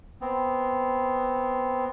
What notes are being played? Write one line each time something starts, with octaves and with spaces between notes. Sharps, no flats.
B3 C4